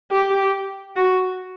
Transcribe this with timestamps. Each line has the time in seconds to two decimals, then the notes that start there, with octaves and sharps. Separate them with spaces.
0.11 G4
0.96 F#4